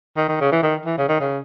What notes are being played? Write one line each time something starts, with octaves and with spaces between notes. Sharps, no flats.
D#3
D#3
C#3
E3
D#3
E3
C#3
D#3
C#3